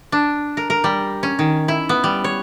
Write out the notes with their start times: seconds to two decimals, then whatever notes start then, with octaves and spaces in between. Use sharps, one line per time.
0.12 D4
0.57 A#4
0.70 A#4
0.84 G3
1.23 C#4
1.39 D#3
1.68 E4
1.89 B3
2.04 G3
2.24 C#5